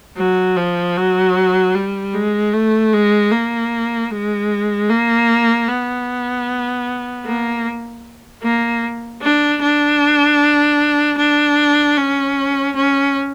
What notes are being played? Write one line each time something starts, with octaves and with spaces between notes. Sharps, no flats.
F#3
F3
F#3
G3
G#3
A3
G#3
A#3
G#3
A#3
B3
A#3
A#3
D4
D4
D4
C#4
C#4